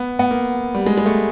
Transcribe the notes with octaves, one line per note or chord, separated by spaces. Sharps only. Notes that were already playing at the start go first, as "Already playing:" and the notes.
Already playing: B3
B3
A#3
G3
G#3
G#3
A3